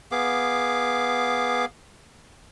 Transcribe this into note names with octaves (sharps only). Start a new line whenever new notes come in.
B3 G#4 F5 D6